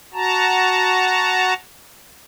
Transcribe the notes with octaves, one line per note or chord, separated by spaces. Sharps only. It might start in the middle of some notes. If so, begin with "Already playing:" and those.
F#4 A5 A#5